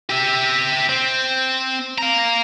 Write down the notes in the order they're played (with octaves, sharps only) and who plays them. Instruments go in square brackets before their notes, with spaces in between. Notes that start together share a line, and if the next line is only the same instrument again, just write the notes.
[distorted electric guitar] G4 E5
C4
F5 A#5